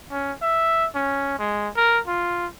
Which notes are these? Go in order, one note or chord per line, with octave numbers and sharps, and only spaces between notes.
C#4
E5
C#4
G#3
A#4
F4